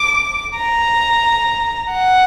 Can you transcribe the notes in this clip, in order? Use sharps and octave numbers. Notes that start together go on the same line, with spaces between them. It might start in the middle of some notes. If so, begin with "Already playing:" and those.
Already playing: D6
A#5
F#5